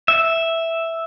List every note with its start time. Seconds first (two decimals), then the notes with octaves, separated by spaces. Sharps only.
0.08 E5